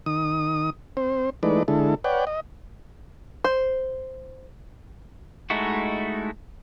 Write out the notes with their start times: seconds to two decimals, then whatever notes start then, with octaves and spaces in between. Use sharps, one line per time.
0.06 D#3 D#6
0.97 C4 C5
1.43 E3 G#3 A3 D#4 B4 D5
1.68 D3 G#3 E4 A4
2.04 B4 C#5 D5 F#5 G5
2.27 D#5
3.44 C5
5.50 G#3 A3 D#4 E4 F#4